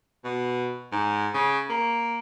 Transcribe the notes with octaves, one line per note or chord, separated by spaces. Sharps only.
B2
G#2
C#3
A#3